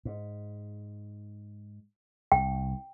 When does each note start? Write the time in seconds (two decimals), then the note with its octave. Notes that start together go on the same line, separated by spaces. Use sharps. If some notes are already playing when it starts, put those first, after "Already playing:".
0.05 G#2
2.32 C2 G5